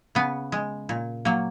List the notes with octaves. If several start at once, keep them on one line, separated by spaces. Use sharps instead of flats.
C#3 B3
G#3
A#2
F#3 A#3